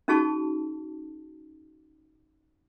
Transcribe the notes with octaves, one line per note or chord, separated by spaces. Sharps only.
C#4 D#4 F#4 G#4 A5 C#6